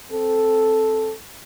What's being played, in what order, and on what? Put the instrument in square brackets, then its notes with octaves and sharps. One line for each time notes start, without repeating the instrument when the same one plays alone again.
[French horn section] C4 A4